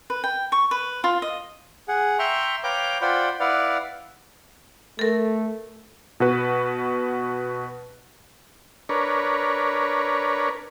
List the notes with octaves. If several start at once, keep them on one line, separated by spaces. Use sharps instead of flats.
B4
G5
C#6
B4
F4
D#5
G#4 F#5
E5 G5 A#5 C6 C#6
B4 C#5 F5 G5 A#5 D6
F4 C5 D5 F#5 G5 B5
E4 B4 D5 F5 F#5
A3 A4 A#4
B2 F#4 B4
D4 A#4 B4 C#5